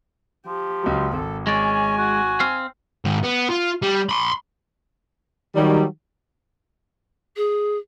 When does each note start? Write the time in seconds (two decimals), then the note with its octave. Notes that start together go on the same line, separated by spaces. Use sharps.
0.47 F3 G4
0.83 C#2 F#3
1.12 G#1 A4
1.47 G#3 C#4 D5 G#5
1.97 F#4
2.40 C4 F5
3.05 G#2 D#3
3.23 B3
3.50 F4
3.82 G3
4.09 B5 C6
5.56 D#3 F#3 G3
7.36 G#4